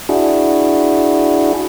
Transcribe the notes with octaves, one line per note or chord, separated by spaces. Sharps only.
D4 E4 F#4 G#4